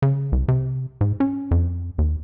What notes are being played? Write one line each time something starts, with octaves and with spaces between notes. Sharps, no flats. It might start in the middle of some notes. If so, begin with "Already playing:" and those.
C#3
C2
C3
G#2
C#4
F2
D#2